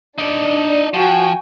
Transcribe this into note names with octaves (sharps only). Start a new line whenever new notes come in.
D4 D#4 D5
F3 F#4 G5 G#5